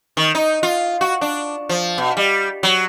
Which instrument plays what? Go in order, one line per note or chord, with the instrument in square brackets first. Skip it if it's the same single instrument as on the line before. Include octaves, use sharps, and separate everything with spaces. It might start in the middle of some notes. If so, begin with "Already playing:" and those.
[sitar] D#3
D#4
F4
F#4
D4
F3
B2
G3
F#3